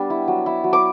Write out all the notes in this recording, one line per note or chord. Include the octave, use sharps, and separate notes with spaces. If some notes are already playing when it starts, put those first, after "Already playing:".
Already playing: G3 B3 D4
E4
F#3
E4
F#3
D6